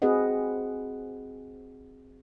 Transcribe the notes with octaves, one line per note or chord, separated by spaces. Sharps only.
C4 F#4 G#4 B4 D#5 F#5